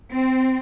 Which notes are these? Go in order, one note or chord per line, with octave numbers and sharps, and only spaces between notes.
C4